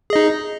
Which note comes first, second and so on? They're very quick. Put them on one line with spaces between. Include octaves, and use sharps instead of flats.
G#4 D#5 D#4